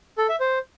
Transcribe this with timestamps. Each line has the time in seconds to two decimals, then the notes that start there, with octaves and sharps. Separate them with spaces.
0.18 A4
0.29 E5
0.40 C5